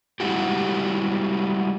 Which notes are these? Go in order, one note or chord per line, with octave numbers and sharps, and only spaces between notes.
G3 G#3 E4 F#4 G4